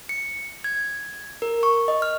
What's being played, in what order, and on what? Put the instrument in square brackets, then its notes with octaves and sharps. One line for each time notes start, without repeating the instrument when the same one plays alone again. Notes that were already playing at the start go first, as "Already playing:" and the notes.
[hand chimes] C#7
G#6
A#4
C#6
D#5
F6